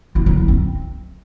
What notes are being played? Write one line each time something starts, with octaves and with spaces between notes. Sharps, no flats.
E4
D#4
E4
C4